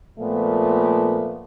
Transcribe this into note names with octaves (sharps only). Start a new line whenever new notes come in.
A#2 F3 A3 B3